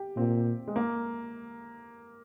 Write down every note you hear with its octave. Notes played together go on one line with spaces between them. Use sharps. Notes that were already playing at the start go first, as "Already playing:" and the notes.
Already playing: G4
A#2 C4
G#3
A#3